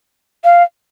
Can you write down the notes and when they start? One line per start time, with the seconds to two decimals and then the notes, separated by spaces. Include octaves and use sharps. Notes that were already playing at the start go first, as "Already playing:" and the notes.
0.44 F5